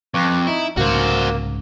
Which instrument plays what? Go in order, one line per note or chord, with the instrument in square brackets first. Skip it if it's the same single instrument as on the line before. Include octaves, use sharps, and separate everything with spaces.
[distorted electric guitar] F2 [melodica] B4 C#6 D6
[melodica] D#4 [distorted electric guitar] E4
[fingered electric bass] C2 G#2 C#3 [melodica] A#3 [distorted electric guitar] F#4 C5